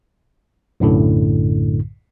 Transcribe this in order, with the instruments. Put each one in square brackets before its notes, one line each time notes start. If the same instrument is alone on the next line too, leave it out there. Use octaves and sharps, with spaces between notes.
[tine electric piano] B1 F#2 A2 D3